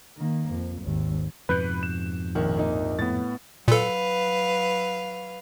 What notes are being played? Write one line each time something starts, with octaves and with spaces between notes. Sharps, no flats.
D#3 A#3
F2
G#1 D#2
F2 G#2 B2 B4 F#6 G6
E7
A#1 D#3
A#3 D#4
A2 B3 A6
A#2 F#3 A4 B4 F5